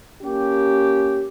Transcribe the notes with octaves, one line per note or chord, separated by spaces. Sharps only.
A#3 C#4 G4